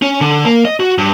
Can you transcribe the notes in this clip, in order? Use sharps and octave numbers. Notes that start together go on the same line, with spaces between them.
C#4
D3
A#3
D#5
F#4
G2